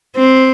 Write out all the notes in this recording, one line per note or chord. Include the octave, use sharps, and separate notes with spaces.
C4